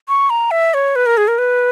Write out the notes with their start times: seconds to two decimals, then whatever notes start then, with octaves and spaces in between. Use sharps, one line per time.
0.09 C#6
0.30 A#5
0.51 E5
0.74 C#5
0.96 B4
1.06 A#4
1.17 G#4
1.28 A#4
1.38 B4